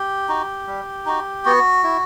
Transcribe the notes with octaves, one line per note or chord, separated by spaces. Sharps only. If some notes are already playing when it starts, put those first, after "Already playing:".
Already playing: G4
D#4 F#4
G3
D#4 F#4
B3 F#4
E4